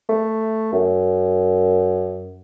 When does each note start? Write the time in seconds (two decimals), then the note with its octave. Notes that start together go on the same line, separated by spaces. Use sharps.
0.09 A3
0.73 F#2